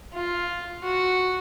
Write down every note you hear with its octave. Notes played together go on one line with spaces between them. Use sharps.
F4
F#4